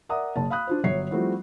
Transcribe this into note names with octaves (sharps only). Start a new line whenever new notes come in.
A#4 D5 E5 F#5 A#5 D#6
F#1 A5
F5 B5 D#6 F#6
D4 F4 C5
G1 F#3 C#5 E5 C7
F3 G3 A3 C4 E4 F#4